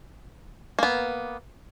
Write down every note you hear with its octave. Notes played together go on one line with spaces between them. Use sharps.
A#3 B3